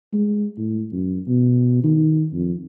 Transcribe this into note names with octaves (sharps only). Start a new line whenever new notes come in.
G#3
A2
F#2
B2
D#3
F2